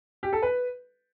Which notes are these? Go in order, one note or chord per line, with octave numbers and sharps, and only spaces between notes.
G4
A4
B4